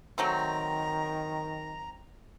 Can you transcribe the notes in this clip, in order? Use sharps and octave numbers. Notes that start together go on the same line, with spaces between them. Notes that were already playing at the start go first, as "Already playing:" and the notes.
D#3 F#3 A3 C4 A#5